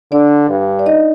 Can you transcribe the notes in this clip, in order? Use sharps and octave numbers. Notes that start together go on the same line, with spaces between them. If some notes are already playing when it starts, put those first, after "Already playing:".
D3 D4 D5
G2
D5
D#4 D#5